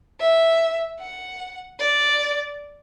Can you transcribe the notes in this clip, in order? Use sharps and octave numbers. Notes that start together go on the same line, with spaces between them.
E5
F#5
D5